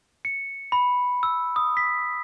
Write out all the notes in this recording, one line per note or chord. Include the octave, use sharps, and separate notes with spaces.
C#7
B5
E6
D#6
B6